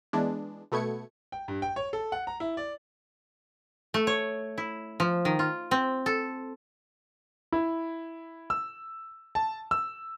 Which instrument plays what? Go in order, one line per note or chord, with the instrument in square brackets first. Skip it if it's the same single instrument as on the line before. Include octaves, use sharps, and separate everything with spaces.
[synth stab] E3 G#3 B3 D4
B2 A3 B3 G#6 C#7
[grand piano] G5
G2
G5
C#5
A4
F#5
A#5
E4
D5
[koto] A3
C#5
E4
F3
D#3
F4
C4
A4
[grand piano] E4
E6
A5
E6